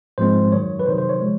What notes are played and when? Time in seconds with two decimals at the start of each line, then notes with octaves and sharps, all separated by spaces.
0.18 G#2 F3 G#3 C4 C5
0.52 F#2 D#3 F#3 C#5
0.79 B4
0.86 C3 D#3 F#3 C5
0.98 C5
1.09 C#5
1.21 F3 G#3